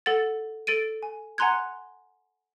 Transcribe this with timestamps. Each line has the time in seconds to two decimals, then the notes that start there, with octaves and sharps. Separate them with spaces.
0.06 A4 F#5 A6
0.67 A4 A6 D7 D#7
1.03 G#5
1.38 F#5 G#5 A#5 C6 F#6 G#6